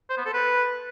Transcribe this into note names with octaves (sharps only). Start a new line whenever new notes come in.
C5
B3
A4
B4